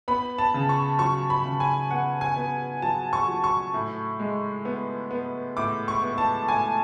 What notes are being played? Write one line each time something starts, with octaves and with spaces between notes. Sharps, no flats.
B3 B5
A5
C#3
C#6
F#3 C#6
B5
C#3
G#5
B3 F#5
G#5
B3
F#3 A5
C#6
F#3
C#6
A2
G#3
B3
B3
A2 D6
C#6
B3
A5
A2 G#5